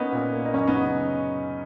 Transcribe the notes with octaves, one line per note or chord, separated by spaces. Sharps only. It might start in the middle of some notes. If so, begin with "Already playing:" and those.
Already playing: A#3 B3 C#4 D#4
A#2
A#3
D#4
F#2 C#4
B3 D#4
C#3 F#3